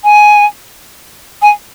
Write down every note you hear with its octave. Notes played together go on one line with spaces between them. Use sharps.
G#5
G#5